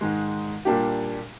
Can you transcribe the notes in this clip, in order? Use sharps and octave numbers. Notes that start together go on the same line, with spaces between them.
G#2 D#3 G#3
A#2 G3 A#3 D4 G4